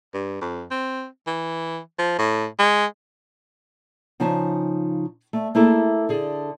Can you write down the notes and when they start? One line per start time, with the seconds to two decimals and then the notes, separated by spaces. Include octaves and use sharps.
0.14 G2
0.41 F2
0.71 C4
1.27 E3
1.99 F3
2.18 A2
2.59 G#3
4.20 C#3 F3 D#4 G#5 A5
5.33 A3
5.55 A3 A#3 E4 G#4 A4
6.09 D3 G#4 A4